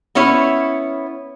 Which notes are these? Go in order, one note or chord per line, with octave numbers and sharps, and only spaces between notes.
B3 C#4 E4 C#5